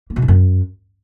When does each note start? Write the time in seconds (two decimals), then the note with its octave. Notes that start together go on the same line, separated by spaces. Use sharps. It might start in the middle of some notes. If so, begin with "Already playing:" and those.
0.10 A#3
0.16 B2
0.22 G#2
0.28 F#2